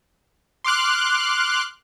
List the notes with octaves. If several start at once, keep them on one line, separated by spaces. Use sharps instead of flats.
C6 D6 F6 F#6